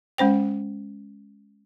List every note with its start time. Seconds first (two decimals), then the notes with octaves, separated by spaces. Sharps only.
0.18 G#3 C#4 C5 G5